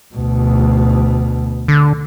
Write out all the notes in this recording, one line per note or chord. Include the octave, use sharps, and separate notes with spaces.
D2 B2
D3